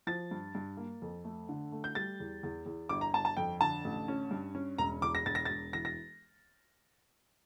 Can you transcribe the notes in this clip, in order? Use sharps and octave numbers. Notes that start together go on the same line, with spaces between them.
F3 A6
G2
G2
A#3
F2
A3
D3
A3
G6
G3 A6
E2
E2
E2
G1 D6
A#5
G1 A5
A5
F2 G5
D3 A5
A1
C#4
G2
C#4
E1 A#5
E2 D6
A#6
E1 A6
A#6
E1 A6
E3 A#6
A#6